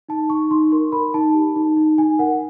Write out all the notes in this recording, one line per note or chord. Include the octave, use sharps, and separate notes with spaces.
D#4 A5
D#4 C#6
D#4 C6
A#4 C6
A#4 B5
D#4 A5
G4
D#4
D#4
D#4 G#5
A#4 F#5